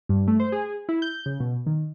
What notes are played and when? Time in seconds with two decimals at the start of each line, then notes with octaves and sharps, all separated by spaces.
0.09 G2
0.28 A3
0.40 C5
0.52 G#4
0.89 E4
1.02 G6
1.26 C#3
1.40 B2
1.66 D#3